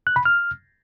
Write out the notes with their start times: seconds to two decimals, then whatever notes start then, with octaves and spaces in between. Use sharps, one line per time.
0.07 F#6
0.16 B5
0.25 F6